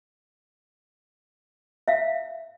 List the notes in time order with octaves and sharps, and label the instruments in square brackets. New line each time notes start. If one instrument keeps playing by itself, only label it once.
[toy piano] E5 F5